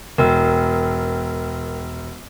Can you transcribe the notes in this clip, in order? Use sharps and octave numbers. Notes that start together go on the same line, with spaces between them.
E1 A#4 G5 E6